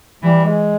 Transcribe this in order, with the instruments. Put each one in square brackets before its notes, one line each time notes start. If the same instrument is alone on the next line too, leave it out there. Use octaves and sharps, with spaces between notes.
[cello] E3 [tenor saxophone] G3
[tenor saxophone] G#3